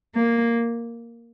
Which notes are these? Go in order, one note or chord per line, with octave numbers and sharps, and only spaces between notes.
A#3